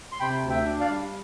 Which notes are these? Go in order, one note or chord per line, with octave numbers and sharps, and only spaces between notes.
C6
C3 G5 B5
D2
E5 G5
D4
D5 F5
G3